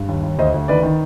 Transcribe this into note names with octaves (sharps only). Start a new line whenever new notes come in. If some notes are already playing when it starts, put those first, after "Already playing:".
Already playing: G2
D#2
D#2
D2 C5 D#5
D2
D#3 B4 D5
D#3